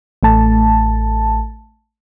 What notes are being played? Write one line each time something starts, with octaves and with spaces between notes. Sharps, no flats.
A1 A3 A5